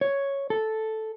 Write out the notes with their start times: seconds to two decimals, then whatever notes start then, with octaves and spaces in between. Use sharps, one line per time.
0.01 C#5
0.50 A4